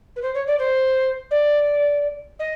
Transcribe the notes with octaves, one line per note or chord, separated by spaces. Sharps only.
B4
C5
C#5
D5
C5
D5
D#5